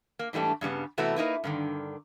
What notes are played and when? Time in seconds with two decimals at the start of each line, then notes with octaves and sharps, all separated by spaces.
0.19 A#3
0.33 G#2 E3 G3 A3 D4
0.61 G2 C#3 G3 B3
0.98 C3 E3 A3 B3 E4 F#4
1.16 A#3 D#4 E4 B4
1.44 G2 D3 D#3